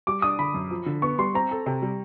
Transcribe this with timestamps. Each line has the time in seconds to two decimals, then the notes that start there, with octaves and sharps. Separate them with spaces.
0.07 G3 D6
0.22 D4 D#6
0.39 D3 B5
0.54 F#2
0.71 F3
0.86 D3
1.02 B3 C#6
1.18 G3 C6
1.34 C4 A#5
1.51 A4
1.66 C3
1.82 G3